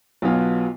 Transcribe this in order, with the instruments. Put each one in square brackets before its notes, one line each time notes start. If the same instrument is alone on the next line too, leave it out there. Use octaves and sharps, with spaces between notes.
[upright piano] B1 B2 F#3 B3 F4